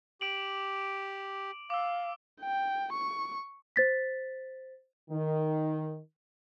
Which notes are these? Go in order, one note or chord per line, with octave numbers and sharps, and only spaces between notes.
G4 D6 D7 F#7
F5 D6 E6
G5
C#6
C5 A6 B6
D#3